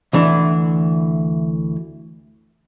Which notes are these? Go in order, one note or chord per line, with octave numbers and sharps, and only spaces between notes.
D2 E3 D4